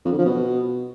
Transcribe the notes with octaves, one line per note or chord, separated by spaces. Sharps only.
F2
D3
F3
B2